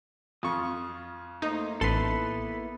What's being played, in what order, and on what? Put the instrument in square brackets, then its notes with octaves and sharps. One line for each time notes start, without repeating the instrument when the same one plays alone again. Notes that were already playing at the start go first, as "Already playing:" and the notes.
[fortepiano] F2 F4 C#6 [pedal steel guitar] D#6
[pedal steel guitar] A3 A#3 C5 [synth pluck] D#4
[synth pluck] A1 C6 [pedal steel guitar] A#3 B3 E4 [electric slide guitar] A4 B4